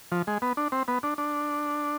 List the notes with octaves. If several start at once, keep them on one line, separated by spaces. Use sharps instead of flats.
F3
G#3
B3
D4
C4
B3
D4
D4